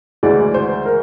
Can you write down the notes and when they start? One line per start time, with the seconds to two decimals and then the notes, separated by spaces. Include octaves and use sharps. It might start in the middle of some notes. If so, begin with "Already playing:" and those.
0.23 D2 C#3 E3 G#3 D5
0.54 C5
0.86 A#4